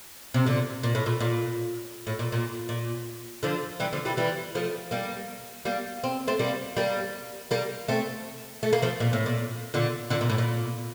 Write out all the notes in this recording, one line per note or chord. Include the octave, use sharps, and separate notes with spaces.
C3
A#2 D3
A#2
A2
A#2
A#2
A2
A#2
A#2
A#2
D3 F3
E3 G3
D3 F3
E3 G3
E3 G3
F3 A3
G3 A#3
G3 A#3
C4
A3 C4
G3 A#3
G3 A#3
G3 A#3
A3 C4
A3
A#3
F3 A3
A#2
A2
A#2
A#2 D3
A#2 D3
A#2
A2
A#2